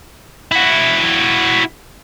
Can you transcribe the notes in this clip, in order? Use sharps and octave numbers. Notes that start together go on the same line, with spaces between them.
E4 F#4